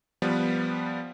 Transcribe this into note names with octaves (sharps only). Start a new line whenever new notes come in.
F3 G3 B3 B4